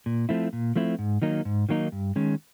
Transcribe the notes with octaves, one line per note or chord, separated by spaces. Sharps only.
A#2
F3 A3 C4 E4
A#2
F3 A3 C4 E4
G#2
D#3 F#3 A#3 D#4
G#2
D#3 F#3 A#3 D#4
G2
D#3 G#3 C#4